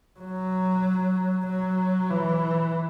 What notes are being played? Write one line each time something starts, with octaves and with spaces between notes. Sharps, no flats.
F#3
F#3
E3